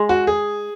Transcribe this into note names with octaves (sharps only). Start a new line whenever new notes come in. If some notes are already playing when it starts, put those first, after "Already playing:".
Already playing: G#3
F#4
G#4